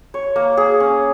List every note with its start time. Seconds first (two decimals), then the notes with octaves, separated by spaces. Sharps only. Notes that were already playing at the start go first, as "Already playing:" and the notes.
0.14 C#5
0.36 A#3
0.57 G#4
0.80 C#4